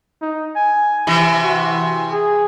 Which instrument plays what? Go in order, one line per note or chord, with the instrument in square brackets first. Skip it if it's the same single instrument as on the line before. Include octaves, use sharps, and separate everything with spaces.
[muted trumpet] D#4
G#5
[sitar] C3 E3
[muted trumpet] F#4
G#4